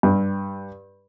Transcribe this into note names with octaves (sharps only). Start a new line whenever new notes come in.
G2